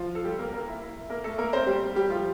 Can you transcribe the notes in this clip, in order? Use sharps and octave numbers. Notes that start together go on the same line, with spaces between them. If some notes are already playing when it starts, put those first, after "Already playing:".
Already playing: F3 F4
A4
G3 G4
A#3 A#4
A#3 A#4
E4
E4
A#3 A#4
A3 A4
A#3 A#4
C4 C5
G3 G4
G3 G4
F3 F4